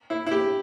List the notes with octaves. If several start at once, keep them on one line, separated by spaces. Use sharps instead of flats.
E4
E4
G4